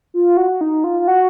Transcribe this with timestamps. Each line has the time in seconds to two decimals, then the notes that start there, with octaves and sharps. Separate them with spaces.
0.14 F4
0.37 F#4
0.61 D#4
0.84 F4
1.00 F4
1.08 F#4